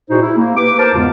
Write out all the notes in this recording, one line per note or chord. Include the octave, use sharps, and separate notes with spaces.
A#2 D#4 E4 F#4 G#4 C5
E4
A#3
G4 B4 D6
A#4 C5 A5
E2 G#2 C#3 G#3 B3 F4